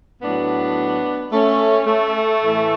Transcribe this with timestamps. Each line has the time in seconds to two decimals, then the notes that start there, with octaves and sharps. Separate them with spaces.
0.22 A2 F#3 B3 D4
1.31 A3 C#4
1.86 A3
2.41 A2 E3